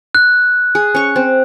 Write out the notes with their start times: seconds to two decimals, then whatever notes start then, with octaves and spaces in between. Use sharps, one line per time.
0.15 F#6
0.75 G#4
0.95 C#4 C#6
1.16 C4